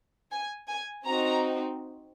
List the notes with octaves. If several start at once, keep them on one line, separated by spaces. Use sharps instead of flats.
G#5
G#5
C4 D#4 F#4 A#5